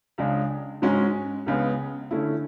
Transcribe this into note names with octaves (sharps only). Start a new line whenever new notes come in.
C#2 C#3 G#3 D4
G#2 G#3 C#4 F#4
C#2 C#3 G#3 B3
D3 A3 C#4 E4